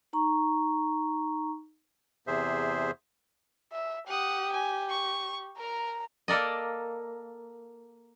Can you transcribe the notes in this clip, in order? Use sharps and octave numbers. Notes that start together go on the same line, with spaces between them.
D#4 A#5 C#6
E2 C3 G#4 C5 E5
E5
G4 F#5 D#6
G#5
C#6
A#4 A#5
A#3 A4 A#4 D5 D#5